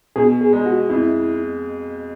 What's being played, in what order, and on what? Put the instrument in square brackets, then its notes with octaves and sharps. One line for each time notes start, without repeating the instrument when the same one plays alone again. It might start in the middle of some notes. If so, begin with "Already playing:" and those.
[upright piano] B2 [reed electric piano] G#4
[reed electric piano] G#4
[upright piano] G#3
[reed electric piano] F#4
[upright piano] F2 [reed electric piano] E4